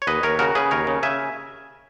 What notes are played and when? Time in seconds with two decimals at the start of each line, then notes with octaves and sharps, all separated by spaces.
0.02 C#5
0.07 D#2 B4 D#5
0.23 D#2 A#4 C#5
0.39 C#3 F#4 A#4
0.55 C#3 G#4 B4
0.71 D#2 A#4 C#5
0.87 C#3
1.03 C#3 E5 G#5